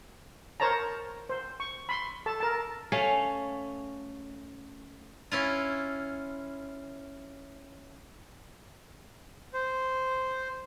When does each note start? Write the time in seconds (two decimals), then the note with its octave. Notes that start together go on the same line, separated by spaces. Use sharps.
0.60 A#4 C5 C#5 A5 A#5
1.29 C5
1.60 C#6
1.89 B5 C6
2.26 A4 A5
2.40 A#4 A5
2.92 A3 C#4 F5
5.32 C#4 E4 F4
9.53 C5